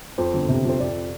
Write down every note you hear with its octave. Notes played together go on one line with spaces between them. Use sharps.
F2 C5
G1
C3
F2 C5
F2 D5